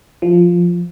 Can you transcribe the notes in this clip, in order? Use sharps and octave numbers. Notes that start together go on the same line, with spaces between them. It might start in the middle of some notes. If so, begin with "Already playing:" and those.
F3